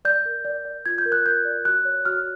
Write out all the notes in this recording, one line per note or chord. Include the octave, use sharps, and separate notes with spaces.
D5 G6
A#4
D5
D5
F4 G#6
G6
A#4
F#6
A#4 G6
D5
F#4 F#6
C#5
F#4 F6